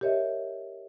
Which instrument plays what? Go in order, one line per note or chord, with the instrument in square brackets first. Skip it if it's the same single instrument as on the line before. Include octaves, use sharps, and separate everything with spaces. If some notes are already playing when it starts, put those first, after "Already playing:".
[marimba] G4 A#4 C#5 D#5 E5